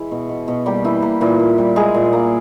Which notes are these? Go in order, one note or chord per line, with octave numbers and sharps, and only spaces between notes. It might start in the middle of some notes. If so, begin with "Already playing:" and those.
Already playing: E3 G#3 E4
B2
B2
B2
G3 A#3 G4
E3 A#3 E4
A#3
A#2 E3 E4
A#2
G3
G#3 A#3 G#4
A#2
A#3